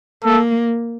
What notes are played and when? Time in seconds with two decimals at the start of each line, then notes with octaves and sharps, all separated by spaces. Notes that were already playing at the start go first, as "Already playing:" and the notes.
0.24 A#3 A4